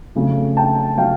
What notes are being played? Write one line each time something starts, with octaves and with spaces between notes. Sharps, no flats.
F2 C#3 F#3 A3
G5 A5
C#3 F#3 A3 F5 G5